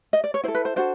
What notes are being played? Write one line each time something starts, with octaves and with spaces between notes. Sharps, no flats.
D#5
D5
C#5
E4 A4 C5
B4
C5
D4 F#4 A4 C5 D5